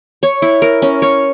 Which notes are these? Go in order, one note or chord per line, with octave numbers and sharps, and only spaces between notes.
C#5
E4
A#4
C#4
C#5